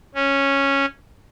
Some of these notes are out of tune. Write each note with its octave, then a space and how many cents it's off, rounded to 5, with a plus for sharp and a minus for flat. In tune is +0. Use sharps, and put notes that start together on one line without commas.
C#4 -5